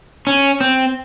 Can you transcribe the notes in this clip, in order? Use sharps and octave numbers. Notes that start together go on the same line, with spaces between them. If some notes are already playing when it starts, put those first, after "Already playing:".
C#4
C4